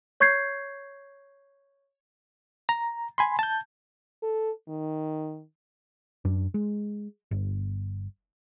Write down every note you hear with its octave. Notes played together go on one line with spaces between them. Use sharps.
C#5 C#6 G6 G#6 C7
A#5
G#5 B5 C6
A5 G6
A4
D#3
F#2 D4
G#3
G1